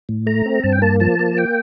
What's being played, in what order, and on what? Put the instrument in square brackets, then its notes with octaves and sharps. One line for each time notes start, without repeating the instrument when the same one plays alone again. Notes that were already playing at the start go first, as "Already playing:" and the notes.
[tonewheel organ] A2
A3 A#5
C4
G2 A5
G5
A#3 A5
F3 A5
A#3
G5